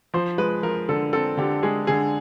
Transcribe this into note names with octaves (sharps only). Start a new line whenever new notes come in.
F3 C5
G#3 B4
F3 A#4
D3 A4
C4 A4
D3 G4
G#3 G#4
D3 G#4